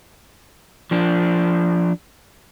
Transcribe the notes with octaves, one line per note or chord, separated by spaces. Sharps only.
F3 D4